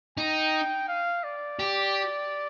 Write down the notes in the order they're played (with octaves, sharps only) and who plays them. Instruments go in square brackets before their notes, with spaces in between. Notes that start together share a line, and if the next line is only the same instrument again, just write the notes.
[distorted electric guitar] D#4 [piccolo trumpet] G5
[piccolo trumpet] F5
D5
[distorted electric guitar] G4